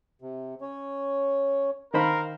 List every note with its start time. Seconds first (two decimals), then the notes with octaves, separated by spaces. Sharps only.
0.22 C3
0.61 C#4 C#5
1.94 D#3 A#4 C5 F5 B5